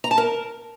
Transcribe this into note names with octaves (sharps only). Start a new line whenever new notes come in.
A#5
A5
A#4